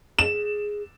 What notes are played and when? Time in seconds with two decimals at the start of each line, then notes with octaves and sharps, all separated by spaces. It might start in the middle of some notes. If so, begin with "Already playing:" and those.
0.19 G#4 E7